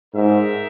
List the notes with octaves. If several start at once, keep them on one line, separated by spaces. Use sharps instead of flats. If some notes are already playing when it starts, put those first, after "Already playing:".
G#2 D#4 A#4 E5